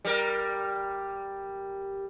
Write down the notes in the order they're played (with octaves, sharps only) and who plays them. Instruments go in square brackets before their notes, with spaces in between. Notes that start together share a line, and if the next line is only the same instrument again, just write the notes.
[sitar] G3 A#4